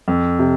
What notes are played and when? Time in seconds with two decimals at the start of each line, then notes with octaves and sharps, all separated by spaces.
0.08 F2
0.39 C3